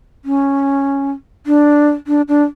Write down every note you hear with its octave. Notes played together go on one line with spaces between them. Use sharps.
C#4
D4
D4
D4